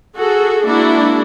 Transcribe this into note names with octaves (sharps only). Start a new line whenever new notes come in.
F#4 G#4 A4
G#3 A#3 D4 E4 F#4